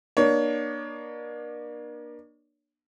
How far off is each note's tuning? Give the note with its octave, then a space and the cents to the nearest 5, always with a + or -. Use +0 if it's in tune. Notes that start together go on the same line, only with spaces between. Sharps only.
A#3 +35 D4 +35 C#5 +30